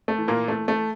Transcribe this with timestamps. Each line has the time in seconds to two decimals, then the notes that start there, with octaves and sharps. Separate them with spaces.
0.08 A3
0.18 E3
0.28 A#2 A#3
0.48 E3 A3
0.68 A3